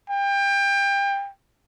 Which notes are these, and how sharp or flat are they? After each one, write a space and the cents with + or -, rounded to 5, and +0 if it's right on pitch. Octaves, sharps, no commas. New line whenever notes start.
G5 +25